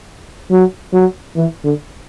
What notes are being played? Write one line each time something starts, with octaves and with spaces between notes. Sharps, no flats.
F#3
F#3
E3
D3